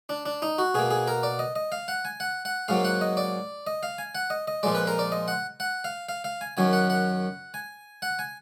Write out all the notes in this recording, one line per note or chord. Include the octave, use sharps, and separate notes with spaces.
D4
D4
D#4
F#4
B2 A#3 G#4
G#4
A#4
D5
D#5
D#5
F5
F#5
G#5
F#5
F#5
G#2 F#3 A#3 F5
F#5
D#5
D5
D#5
F5
G#5
F#5
D#5
D#5
A#2 F3 G#3 D5
B4
A#4
D5
D#5
F#5
F#5
F5
F5
F5
G#5
F#2 D#3 F#3 G#5
F#5
F#5
G#5
F#5
G#5